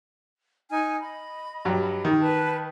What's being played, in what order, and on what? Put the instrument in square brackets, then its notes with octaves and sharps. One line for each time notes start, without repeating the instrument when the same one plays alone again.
[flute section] D#4 G#5 F6
D#5 B5
[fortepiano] G2 F#3
D#3
[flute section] B4 A5